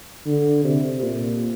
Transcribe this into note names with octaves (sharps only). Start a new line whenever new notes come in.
D3
C3
A#2